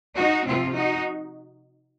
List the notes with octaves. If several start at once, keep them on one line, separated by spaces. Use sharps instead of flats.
D#4 F#4
C3 F3 C4 F4
D#4 F#4